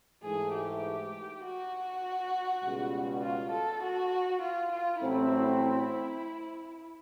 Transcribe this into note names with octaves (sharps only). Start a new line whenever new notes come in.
G#2 E3 A3 G#4
G4
F#4
C#2 B2 G3
F4
A4
F#4
F4
F4
A1 A2 F#3 A3 C4 E4